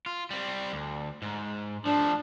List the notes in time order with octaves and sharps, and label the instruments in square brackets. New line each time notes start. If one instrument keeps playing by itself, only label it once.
[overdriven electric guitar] F4
G3 C4
D2
G#2
[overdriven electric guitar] F3 A3 [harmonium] D4